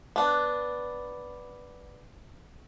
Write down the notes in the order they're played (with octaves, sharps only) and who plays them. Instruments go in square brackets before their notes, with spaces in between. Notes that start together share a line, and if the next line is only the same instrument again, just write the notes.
[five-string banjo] B3 D4